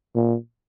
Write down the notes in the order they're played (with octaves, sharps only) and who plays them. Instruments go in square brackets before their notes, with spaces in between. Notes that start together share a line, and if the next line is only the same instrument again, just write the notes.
[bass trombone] A#2